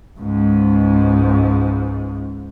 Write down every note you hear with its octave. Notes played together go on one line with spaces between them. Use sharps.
C#2 G#2